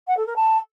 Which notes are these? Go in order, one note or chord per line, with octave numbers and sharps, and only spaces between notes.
F#5
A4
A#4
A5